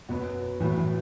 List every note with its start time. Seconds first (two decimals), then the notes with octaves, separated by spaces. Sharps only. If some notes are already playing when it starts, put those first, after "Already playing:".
0.09 F#2 B2 F#3 B3 F#4
0.60 A2 E3 F#3 B3
0.77 E3